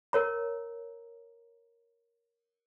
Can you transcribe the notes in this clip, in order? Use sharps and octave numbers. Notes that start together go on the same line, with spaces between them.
A#4 C#5 A#5